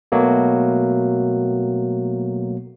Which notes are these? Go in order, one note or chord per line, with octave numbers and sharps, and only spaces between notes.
B2 F#3 A3 A#3